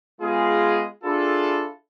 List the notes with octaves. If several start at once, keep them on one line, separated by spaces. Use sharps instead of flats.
G#3 B3 F4 G#4
D4 E4 F4 G#4 A4